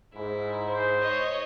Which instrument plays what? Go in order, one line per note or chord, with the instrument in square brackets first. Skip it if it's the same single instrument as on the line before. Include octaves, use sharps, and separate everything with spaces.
[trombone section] G#2 [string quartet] E4
[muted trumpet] C5
[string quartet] C#5 D#5